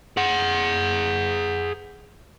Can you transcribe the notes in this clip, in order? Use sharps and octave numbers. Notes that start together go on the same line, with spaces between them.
G#4 F#5